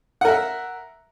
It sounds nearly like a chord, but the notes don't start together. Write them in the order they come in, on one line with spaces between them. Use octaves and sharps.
F#5 A#4 E5